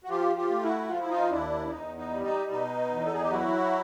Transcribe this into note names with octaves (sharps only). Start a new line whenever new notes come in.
F#4
F3 F4 G4
F4 G4
A3
E4 F#4
F3 F4
E4
D#4 F4
D#2 D4 E4
D4
E2 D#4
D#4
G3
D#4
B2 D#4
E2
A4
G#4
G4
F#3 E4 F#4